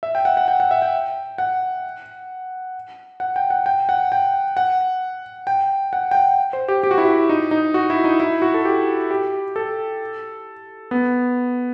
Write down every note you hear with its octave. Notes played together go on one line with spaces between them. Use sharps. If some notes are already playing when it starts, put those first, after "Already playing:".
E5
G5
F#5
F#5
G5
F#5
E5
G5
F#5
F#5
G5
F#5
G5
F#5
G5
F#5
G5
F#5
G5
F#5
C5
G4
G4
F#4
E4
F#4
D#4
D#4
F#4
E4
D#4
E4
F#4
A4
G4
G4
A4
B3